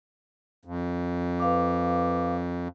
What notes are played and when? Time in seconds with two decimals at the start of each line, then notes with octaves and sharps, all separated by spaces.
0.65 F2
1.40 B4 F5 D6